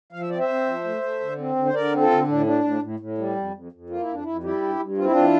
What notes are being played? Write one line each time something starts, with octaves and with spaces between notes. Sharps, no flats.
F3 F5
E5
C4 D5
C5 E5
C4
F3
A3
A3
D3
C4
D3
C5
D3 A#4 D5
C4
F4 A4
D3
A2 D4
D4
A2
A2
A2
G3
F2
F2
F2
A#3 F4
E4
F2 D4
F2 E4
G3 E4 G4
G2
G2
C4 F4
E4
E3 D4 F4